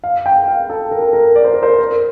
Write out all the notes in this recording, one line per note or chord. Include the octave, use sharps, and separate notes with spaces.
F5
G5
F5
A4
A#4
A4
A#4
D5
C5
A#4
C5
A#4